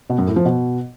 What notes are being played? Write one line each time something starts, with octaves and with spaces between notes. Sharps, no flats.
B2
F#2
A2
F3
B2